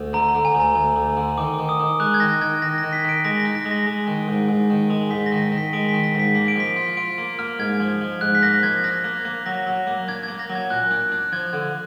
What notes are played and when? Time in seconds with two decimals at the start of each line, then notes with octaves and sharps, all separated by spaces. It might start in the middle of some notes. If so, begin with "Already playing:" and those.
Already playing: D2
0.13 D3 A#5
0.29 A#5
0.35 D3
0.45 G#5
0.55 D2
0.60 A#5
0.75 D2
0.96 D2
1.17 D3
1.38 D#3 D6
1.54 D#3 D6
1.69 D#6
1.80 D#3
2.00 G#3 F#6
2.14 G#6
2.20 D#3 A#6
2.41 D#3 G#6
2.62 D#3 A#6
2.78 D#3 A#6
2.93 B6
3.04 D#3 D7
3.24 G#3 A#6
3.40 A#6
3.45 D#4
3.55 A#6
3.65 G#3
3.71 A#6
3.86 G#3
4.07 D#3
4.28 G#2
4.49 G#2
4.70 D#3
4.90 G#3
5.11 G#2 B6
5.26 A#6
5.32 D#3
5.42 A#6
5.52 D#3
5.58 B6
5.73 G#3 D7
5.89 B6
5.94 D#3
6.04 A#6
6.15 G#2 B6
6.35 A#3 B6
6.48 D7
6.56 F3 B6
6.76 F4
6.97 F4 D7
7.18 A#3
7.39 A#3 F6
7.59 G#2 G#6
7.80 F3
8.01 F3
8.21 G#2 F#6
8.35 B6
8.42 A#3 A#6
8.63 F3 G#6
8.84 D4 A#6
9.04 A#3
9.25 A#3
9.46 F#3 A#6
9.67 F#3
9.87 A#3
10.08 D4 G#6
10.23 G#6
10.28 A#3
10.39 A#6
10.49 F#3
10.55 G#6
10.70 A#2 F#6
10.91 D4
11.12 D4
11.32 F3 G#6
11.53 D3